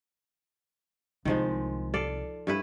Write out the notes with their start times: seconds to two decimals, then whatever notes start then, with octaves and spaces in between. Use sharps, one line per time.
1.25 C2 D#3 F3 G#3
1.94 A4 D5 F5
2.47 G2 E4 B4